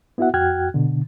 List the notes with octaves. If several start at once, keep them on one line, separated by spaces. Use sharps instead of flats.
B3 E4 F#4 E5 F#5
F2 F#4 G5 F6 F#6 G#6
B2 D3